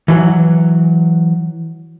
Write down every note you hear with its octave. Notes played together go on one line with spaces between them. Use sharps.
E3 F#3